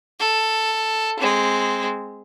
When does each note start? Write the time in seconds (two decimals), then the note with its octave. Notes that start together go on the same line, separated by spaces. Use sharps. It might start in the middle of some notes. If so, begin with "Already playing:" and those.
0.20 A4
1.20 G#3 C4